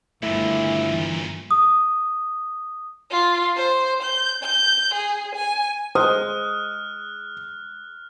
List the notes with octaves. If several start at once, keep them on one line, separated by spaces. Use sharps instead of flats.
G1 D#2 A#2 A3 E4
E3
D#6
F4
C5
G6
G6
G#4
G#5
G#3 C5 G#5 D#6 F6 F#6